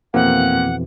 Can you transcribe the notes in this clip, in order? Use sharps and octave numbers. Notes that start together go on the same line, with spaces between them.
F2 B2 E3 A#3 C4 F#5